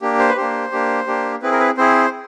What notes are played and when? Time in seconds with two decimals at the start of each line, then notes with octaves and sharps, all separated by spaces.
0.01 A#3 D4 G4
0.19 C5
0.29 B4
0.37 A#3 D4 G4 C5
0.72 A#3 D4 G4
1.07 A#3 D4 G4
1.42 C4 E4 G#4 B4
1.52 A#4
1.60 B4
1.77 C4 E4 G#4 C5